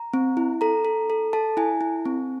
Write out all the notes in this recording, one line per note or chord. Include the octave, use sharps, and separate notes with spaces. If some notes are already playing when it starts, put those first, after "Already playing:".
Already playing: A#5
C4
E4
A4 A#5
A4
A4
A4 A5
E4 G#5
E4
C4